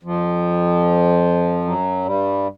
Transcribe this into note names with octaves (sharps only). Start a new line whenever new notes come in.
F2 F3
F#2 F#3
G2 G3